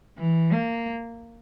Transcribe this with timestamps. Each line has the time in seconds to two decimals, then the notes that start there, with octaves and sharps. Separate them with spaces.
0.19 E3
0.53 A#3